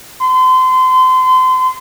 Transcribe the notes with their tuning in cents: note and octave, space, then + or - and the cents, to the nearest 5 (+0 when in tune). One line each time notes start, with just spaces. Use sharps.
C6 -35